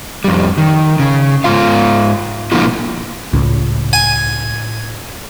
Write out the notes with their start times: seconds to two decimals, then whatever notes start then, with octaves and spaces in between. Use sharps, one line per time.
0.24 F2 G3
0.58 D#3
0.99 C#3
1.44 G#2 F4 F5
2.52 A#2 D3 F3 A#3 E4 F4
3.33 C#2 A2
3.93 G#5